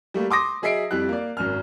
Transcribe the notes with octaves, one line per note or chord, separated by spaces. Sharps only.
G3 A3 A#3
C6 D6 D#6 A#6
F#3 G#4 D#5 E5 C7 D7
F2 G3 E4 F#6
A#3 D5
G#1 F#2 F6